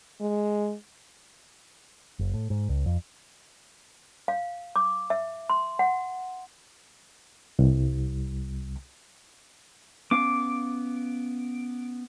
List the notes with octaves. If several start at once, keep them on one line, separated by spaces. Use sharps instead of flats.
G#3
F#1
A2
G#2
C#2
F2
F5
D6
E5
C6
F#5
C2
B3 C#4 F5 D6